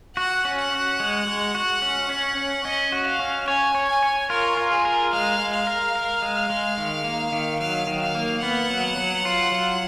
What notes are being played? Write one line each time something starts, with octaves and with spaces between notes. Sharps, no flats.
F#4 F#5
C#4
F#5
F#4
G#3
G#3
F#4
C#4
C#4
C#4
C#4 D#5
F#4
F5
C#4
C#5 G#5
C#5
G#5
C#5
F4 A#4
F4
G#4
A#4
G#3 F5
G#3
F5
A#4
A#4
G#3
G#3
D#3
A#3
D#3
F#3 F5
D#3
F5
A#3
B3 F#5
F#3
F#3
F4
F#3